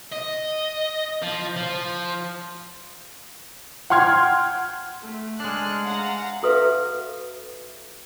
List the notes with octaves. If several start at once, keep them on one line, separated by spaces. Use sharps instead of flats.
D#5
F3
F3
F#5 G5 C6 F6 G#6
A3
G#3 D4 F6 F#6
F5 F#5 A#5
F#4 A4 B4 E5 F5